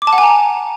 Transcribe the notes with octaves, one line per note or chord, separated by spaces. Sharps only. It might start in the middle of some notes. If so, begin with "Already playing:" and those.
D6
A5
F#5
G#5
A#5